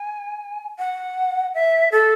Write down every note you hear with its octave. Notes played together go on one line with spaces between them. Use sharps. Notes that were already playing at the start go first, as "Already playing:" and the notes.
Already playing: G#5
F#5
E5
A4